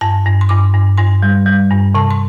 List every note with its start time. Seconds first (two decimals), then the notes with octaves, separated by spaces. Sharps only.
0.01 G2 A5
0.26 G2
0.41 C6
0.49 G2 D6
0.74 G2
0.98 G2 C6
1.22 G3
1.46 G3
1.71 G2
1.95 C3 A5
2.10 C6